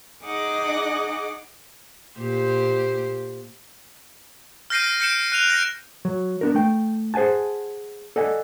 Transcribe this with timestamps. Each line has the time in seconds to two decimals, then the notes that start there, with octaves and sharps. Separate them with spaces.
0.24 D#4 G#4 D#5 F#5 D6
2.19 A#2 G4 C5
4.70 F6 G6 A#6 C7 D7 D#7
4.84 A#6
5.00 F6 G6 C#7 D7 E7
5.32 F#6 D#7 F7
5.50 A#6 D7
6.05 F#3
6.41 B3 D4 A#4
6.55 A3 G5
7.14 G#4 C5 F#5 G#5 A5
8.16 A4 D5 D#5 F#5 G#5